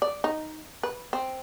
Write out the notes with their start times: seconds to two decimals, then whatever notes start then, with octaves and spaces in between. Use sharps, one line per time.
0.02 D5
0.24 D#4
0.83 B4
1.13 C4